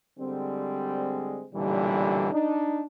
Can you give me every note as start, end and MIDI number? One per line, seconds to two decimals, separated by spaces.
0.18 1.44 50
0.18 1.44 55
0.18 1.44 56
0.18 1.44 60
1.53 2.31 35
1.53 2.31 46
1.53 2.31 50
1.53 2.31 52
1.53 2.31 55
2.31 2.82 62
2.31 2.82 63